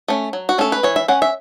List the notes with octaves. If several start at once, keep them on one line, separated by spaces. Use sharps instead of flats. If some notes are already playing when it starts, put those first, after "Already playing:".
A3 C#4
F#3
F#4
A3 C#4 A4
B4
E3 C#5
E5
C#4 F#5
E5